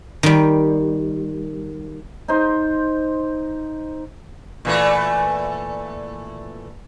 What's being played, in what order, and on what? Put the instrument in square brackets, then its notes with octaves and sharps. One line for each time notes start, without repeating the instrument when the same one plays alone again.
[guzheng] D#3 G3
[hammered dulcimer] D#4 C5
[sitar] A#2 E3 A3